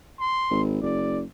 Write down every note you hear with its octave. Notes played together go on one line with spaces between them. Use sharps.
C6
G#1
F#1 D5